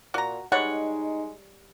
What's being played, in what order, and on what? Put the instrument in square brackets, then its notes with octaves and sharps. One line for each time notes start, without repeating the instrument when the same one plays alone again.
[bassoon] A#2 [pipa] F#4 A#5
[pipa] G3 C#5 [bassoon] G#3 [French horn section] D#4 [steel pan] F#5